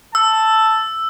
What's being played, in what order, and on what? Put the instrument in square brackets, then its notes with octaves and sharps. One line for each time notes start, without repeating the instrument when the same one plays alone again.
[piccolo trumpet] A5 [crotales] E6